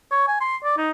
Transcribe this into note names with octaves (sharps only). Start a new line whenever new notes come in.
C#5
G#5
C6
D5
D#4